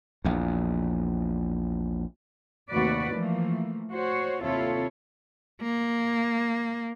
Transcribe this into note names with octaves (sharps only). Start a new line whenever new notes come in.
A#1 E2
D#2 C3 A3 F#4 B4 D5
E3 F3 A3 A#3
F#4 C5 C#5
D#2 C3 E4 F4 A4 C#5
A#3